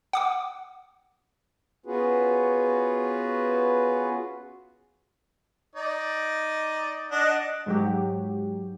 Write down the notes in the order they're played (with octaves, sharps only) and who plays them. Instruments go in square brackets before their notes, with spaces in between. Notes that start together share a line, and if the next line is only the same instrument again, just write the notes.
[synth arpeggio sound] F#5 D6 D#6
[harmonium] B3 C#4 F4 F#4 G#4 B4
[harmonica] D#4 D5
D4 D#5 F#5
[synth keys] G#2 F#3 G4